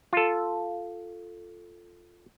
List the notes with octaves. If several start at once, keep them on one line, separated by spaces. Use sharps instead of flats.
F4 A4